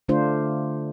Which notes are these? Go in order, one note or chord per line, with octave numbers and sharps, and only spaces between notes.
D3 A3 D4 F4 C5